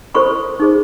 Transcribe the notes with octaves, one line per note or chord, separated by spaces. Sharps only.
E4 A4 C5 B5 C#6
D#4 G#4 C5